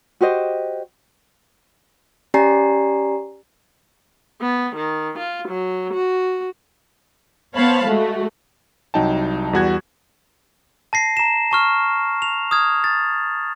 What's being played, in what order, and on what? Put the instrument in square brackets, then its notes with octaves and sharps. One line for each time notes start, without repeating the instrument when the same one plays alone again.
[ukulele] F#4 G4 C5 D#5
[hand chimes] C#4 G4 D5 G#5 A#5 C7
[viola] B3
D#3
F4
F#3
F#4
[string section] B3 C5 C#5 F5 A5 B5
G#3 A3 F#4
[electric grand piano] C2 F#3 D#4 G5 A5
E2 G3 F#4 F#6 G#6
[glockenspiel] A5 A#6 C7
A#5 E7
A5 C#6 F6
F7
D#6 F6 G#6
A6